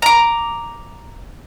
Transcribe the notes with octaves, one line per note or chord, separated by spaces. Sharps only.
A#5 D6